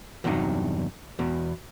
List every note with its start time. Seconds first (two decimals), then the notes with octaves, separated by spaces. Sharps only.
0.24 E2 G2 C3 F#3 D#4
1.19 E2 B2